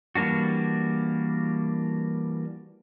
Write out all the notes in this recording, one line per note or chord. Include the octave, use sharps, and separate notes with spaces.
E3 G3 A#3 D4 F#4